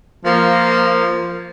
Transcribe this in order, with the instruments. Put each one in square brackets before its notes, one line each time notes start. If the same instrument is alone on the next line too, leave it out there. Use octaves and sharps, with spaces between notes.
[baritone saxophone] F3 [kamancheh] A#3